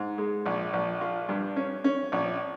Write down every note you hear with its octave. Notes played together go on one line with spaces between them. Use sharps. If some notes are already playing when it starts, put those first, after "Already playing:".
Already playing: G#2
G#3
A#1
A#1
F4
G2
C#4
C#4
A#1